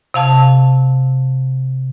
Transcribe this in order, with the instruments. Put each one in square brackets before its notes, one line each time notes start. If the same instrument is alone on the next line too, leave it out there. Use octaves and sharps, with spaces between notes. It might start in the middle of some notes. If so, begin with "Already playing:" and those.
[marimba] C3 F5 A5